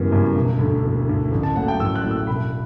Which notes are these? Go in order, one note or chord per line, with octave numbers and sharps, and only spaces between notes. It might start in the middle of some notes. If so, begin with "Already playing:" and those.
Already playing: F#1 F#2 E3 G3 B3
F#2 E3 G3 B3
E1
D2 D3
E1
D2 D3
A1
A5
A2 F#3 A3 F#5
G5
A1 E6
F#6
A2 F#3 A3
E6
E1 B5